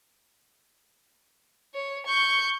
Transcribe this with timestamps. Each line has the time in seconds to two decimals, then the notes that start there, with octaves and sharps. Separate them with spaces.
1.75 C#5
2.06 C#6 G6